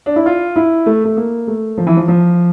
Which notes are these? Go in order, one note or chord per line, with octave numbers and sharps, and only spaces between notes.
D4
E4
F4
E4
A3
A3
A#3
A3
F3
E3
F3
F3